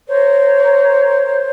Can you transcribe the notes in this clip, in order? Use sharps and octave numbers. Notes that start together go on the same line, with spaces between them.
A#4 C5 C#5